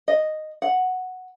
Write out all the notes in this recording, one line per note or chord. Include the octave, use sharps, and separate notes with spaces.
D#5
F#5